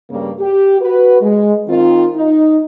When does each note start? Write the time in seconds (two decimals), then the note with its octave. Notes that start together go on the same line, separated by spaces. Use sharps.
0.10 G2 C#3 G3 A#3
0.39 G4
0.80 F#4 B4
1.21 G#3
1.67 D#3 C4 F4
2.15 D#4